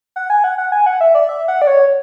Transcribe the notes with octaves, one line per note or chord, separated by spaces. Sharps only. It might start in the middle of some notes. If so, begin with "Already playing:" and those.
F#5
G#5
F#5
F#5
G#5
F#5
E5
D5
E5
F#5
D5
C#5